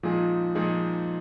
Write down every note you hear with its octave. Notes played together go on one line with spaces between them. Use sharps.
A#2 F3 G#3 D#4 G#4
A#2 F3 G#3 D#4 G#4